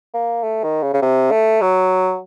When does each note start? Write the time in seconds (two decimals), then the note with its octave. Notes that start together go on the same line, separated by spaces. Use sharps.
0.14 A#3
0.43 A3
0.63 D#3
0.83 C#3
0.93 C#3
1.02 C3
1.31 A3
1.61 F#3